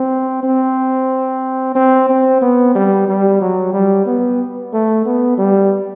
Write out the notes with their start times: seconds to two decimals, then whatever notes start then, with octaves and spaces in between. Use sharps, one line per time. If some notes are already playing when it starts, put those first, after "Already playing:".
Already playing: C4
0.43 C4
1.75 C4
2.09 C4
2.42 B3
2.75 G3
3.08 G3
3.41 F#3
3.73 G3
4.06 B3
4.73 A3
5.06 B3
5.38 G3